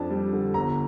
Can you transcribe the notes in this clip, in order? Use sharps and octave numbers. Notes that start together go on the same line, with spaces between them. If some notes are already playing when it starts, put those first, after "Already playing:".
Already playing: F2 D4 A5
G3
D3
G1 A#5